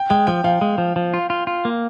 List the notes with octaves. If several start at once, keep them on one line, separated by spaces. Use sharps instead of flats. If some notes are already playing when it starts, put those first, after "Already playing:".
Already playing: G5
G#3 G5
F3 G5
F3 F5
G#3
F3
F3
F4
F4
F4
A#3